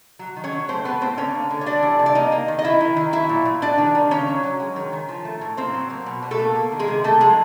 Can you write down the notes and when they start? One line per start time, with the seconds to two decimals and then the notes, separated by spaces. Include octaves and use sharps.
0.19 F#3
0.36 D#3
0.44 C#4 C#5
0.52 F#3
0.68 A3 C4 C5
0.85 A2 B3 B4
1.01 A3 C4 C5
1.17 D3 C#4 C#5
1.34 A#3
1.50 D3
1.61 C#5
1.66 G3 D4 D5
1.83 E3
1.99 C3
2.06 D5
2.15 A#3 D#4 D#5
2.32 A#3
2.48 D#3
2.59 D#5
2.64 D#3 E4 E5
2.81 D#3
2.97 D#3
3.13 F#3 E4 E5
3.29 A#2
3.45 A#2
3.62 G3 D4 D5
3.78 D#3
3.95 D#3
4.11 C#3 C#4 C#5
4.27 F#3
4.43 F#3
4.60 G#3
4.76 D#3
4.93 D#3
5.08 F3
5.25 A3
5.41 A2
5.57 A#3 C4 C5
5.73 F#3
5.90 A#3
6.06 B2
6.22 B2
6.31 A3 A4
6.39 A#3
6.55 A#3
6.72 D#3
6.79 G#3 G#4
6.88 C3
7.04 A3 A#3 A4
7.20 F3 G#3 G#4